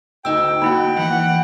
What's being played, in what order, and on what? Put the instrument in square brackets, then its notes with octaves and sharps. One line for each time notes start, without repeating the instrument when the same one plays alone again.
[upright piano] D2 D#4 [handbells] D#5 E6 [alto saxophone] G5
[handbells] A#3 E4 [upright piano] F#4 B5
[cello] E3 F#5